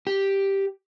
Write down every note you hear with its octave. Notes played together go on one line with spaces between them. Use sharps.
G4